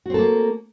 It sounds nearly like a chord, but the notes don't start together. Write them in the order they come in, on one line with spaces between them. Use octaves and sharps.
F#4 C4 A4 A#3